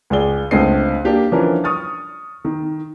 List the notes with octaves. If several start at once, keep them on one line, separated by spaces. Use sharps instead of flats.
C#2 G#4 D5 G7
C#2 D3 A3 C4 D#5 C7
A#3 D4 G4
D3 E3 F3 C#4 D4 A#4
C#6 D#6 F6 A6
D#3